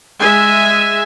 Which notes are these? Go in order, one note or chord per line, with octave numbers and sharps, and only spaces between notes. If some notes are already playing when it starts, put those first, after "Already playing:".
G#3 E5 G#5